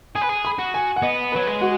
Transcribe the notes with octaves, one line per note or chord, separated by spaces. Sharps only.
G#4 G#5
B4
G#4
B5
F#4
G#5
F#5
B3 D#5
F#3 B4
G#3
F#4